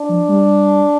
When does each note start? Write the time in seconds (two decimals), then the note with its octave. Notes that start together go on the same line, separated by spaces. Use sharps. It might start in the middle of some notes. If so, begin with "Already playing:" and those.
Already playing: D4
0.09 F3
0.29 G3